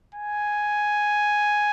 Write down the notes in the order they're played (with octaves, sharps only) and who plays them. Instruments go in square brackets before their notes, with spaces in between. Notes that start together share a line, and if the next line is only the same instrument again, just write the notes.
[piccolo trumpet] G#5